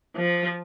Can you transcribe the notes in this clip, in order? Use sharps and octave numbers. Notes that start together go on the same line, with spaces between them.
F3